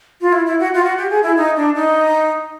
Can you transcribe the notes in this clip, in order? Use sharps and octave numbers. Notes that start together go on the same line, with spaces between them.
F4
E4
E4
F#4
F4
F#4
G4
G#4
E4
D#4
D4
D#4